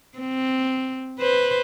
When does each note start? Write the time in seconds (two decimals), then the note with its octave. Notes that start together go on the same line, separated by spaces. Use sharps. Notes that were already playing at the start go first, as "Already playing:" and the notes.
0.18 C4
1.19 B4 C5